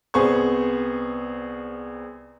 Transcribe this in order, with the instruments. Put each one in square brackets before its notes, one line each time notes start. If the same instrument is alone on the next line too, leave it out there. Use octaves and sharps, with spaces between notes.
[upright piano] C2 B3 G#4 C5 C#6